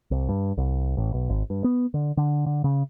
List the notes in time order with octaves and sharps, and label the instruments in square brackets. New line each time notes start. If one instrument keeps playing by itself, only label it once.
[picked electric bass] C2
G2
C2
A1
B1
G#1
G2
B3
D3
D3
D3
C#3